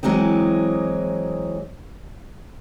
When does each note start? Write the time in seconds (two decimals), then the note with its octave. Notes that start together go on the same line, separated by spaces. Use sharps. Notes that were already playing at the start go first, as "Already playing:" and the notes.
0.03 E3 F#3 G#3 C4 D#4